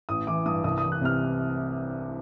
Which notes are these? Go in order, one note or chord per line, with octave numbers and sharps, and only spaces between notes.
A1 D#6
E3 D6
G2 D#6
C2 D#6
E3 D#6
F#6
C3 F6